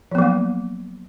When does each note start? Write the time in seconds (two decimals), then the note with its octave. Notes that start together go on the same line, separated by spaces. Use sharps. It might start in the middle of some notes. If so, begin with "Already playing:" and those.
0.11 F3
0.15 B3
0.18 F#3
0.22 A#3